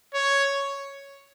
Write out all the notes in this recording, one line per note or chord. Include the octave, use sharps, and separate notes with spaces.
C#5